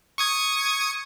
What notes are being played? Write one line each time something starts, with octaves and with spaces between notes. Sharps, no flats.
C#6 D#6 G#6